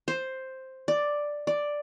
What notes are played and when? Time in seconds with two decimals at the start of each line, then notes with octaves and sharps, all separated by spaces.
0.08 C5
0.88 D5
1.47 D5